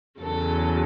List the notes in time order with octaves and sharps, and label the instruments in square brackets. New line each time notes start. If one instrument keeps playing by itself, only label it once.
[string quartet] E2 C#3 F#3 A4